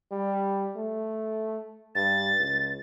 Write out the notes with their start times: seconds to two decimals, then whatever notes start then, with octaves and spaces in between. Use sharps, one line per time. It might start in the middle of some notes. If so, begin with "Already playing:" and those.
0.12 G3
0.76 A3
1.95 G2 A6
2.39 C#2